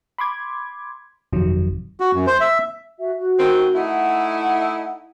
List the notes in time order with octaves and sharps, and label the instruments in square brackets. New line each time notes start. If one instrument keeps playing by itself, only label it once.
[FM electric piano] B5 C6 D6 G#6
G1 F2 C3 D#3 F#3
[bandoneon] F#4
F#2
C5
E5
[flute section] F#4 E5
F#4
[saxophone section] D#3 C4
[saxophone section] A3 D#4 E4 [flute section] F#5